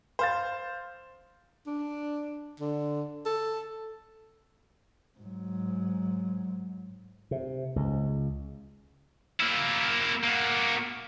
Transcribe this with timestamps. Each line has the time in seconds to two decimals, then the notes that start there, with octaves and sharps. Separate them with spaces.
0.19 C5 F5 A6
1.67 D4
2.60 D3
3.26 A4
5.19 G#2 F#3
7.31 C3
7.76 C#2
9.40 A#3 E4
10.23 A#3 F#4